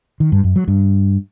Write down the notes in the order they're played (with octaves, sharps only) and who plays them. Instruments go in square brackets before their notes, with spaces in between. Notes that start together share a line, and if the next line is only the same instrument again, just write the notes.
[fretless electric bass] D#3
G2
F#2
F#3
G2